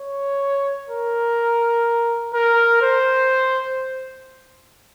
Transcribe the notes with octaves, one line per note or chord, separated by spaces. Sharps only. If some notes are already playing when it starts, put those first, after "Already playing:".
Already playing: C#5
A#4
A#4
C5